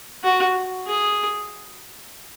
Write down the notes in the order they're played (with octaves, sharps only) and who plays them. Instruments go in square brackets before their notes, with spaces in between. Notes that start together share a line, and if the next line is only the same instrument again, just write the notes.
[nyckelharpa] F#4
G#4